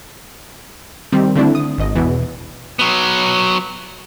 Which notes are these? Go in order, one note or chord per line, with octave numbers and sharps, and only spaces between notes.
D#3 G3 C4
D3 A3 C4 D4 E4
D#6
G#1 D#5
E2 B2 E3
F#3 B3